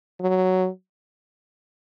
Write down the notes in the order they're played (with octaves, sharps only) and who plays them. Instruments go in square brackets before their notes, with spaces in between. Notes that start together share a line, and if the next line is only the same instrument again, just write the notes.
[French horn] F#3